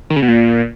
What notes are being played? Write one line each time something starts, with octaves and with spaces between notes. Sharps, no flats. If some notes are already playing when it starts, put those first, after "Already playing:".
D#3
C#3
B2
A#2